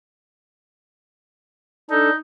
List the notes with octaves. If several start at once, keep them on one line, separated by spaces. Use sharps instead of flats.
D4 D#4 A4